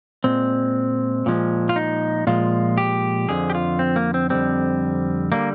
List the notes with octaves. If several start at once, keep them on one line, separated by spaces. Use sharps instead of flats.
A#2 G#3 C4
A#2 F3 G#3
F4
D#4
A#2 F3 G#3 F4
G4
F2 D3 F3 G#4
G4
F4
C4
A#3
C4
F2 D3 G3 C4
D3 G3 A#3